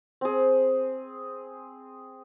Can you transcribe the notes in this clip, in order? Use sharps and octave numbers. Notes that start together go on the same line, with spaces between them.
C4 G#4